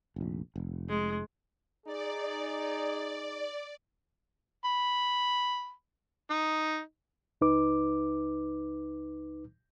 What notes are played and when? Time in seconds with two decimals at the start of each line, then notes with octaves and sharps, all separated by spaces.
0.16 F1 A#1
0.56 F1
0.89 G#3
1.86 D#4 G#4 D5
4.65 B5
6.30 D#4
7.41 C#2 D#4 B4 D6